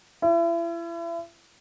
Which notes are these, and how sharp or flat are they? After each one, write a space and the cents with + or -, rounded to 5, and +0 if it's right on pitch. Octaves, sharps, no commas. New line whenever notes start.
E4 +35